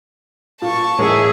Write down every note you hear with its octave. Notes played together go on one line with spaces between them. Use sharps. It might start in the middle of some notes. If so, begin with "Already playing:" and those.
A#2 A5 C#6
A1 A2 G#4 A#4 C#5 E5